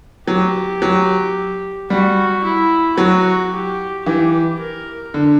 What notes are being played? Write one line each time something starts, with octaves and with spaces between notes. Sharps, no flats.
F#3 G4
F#3
G3 F#4
E4
F#3 F#4
G4
E3 G4
A#4
D3